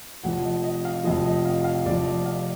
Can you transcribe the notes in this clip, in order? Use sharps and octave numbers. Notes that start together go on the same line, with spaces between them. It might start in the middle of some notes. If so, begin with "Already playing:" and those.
F1 F2 F3 F#5
D#5
D#5
F5
F1 F2 F3 D#5
D#5
F5
F5
F1 F2 F3 D5
D#5
F5